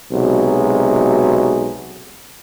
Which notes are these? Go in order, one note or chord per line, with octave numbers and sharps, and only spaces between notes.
B1 C3 G#3 F#4